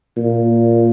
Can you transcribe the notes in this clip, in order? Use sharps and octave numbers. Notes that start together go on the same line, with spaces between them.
A#2